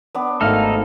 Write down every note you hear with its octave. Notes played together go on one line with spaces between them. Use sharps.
B3 D4
G#1 A3 D#4 A4 F5 F6